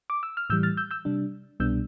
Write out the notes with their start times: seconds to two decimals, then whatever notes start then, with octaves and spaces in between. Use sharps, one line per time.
0.10 D6
0.23 E6
0.37 F6
0.50 A2 E3 G3 E6 G6
0.63 F6 A6
0.77 E6 G6
0.91 E6 G6
1.05 C3 G3 D4
1.60 C2 B2 G3 B3 D4 E6 G6